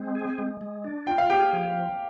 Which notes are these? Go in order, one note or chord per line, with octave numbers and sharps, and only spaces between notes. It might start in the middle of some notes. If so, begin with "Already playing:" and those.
Already playing: G#3 C4
G#4
G#3
G#3
D4
F4 G5
F5
G4 G#4 G5
F3